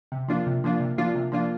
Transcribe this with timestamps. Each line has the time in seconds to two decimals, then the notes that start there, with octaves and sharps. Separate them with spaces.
0.12 C3
0.28 F3 A#3 D4 F4
0.47 C3
0.64 F3 A#3 D4 F4
0.80 C3
0.98 F3 A#3 D4 F4
1.15 C3
1.32 F3 A#3 D4 F4